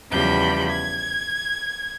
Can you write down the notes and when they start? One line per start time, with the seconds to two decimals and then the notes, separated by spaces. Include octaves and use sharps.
0.10 E2 C#3 F3 G3 B5 G6
0.69 G#6